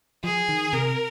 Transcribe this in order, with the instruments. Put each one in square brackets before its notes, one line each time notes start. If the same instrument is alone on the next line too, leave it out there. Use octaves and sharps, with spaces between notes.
[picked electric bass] F3 [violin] G#4
[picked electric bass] D#3
[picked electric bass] C3 [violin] A#4